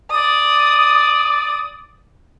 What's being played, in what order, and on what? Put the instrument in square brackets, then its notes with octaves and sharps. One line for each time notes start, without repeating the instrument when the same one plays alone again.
[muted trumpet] D5 [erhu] D#6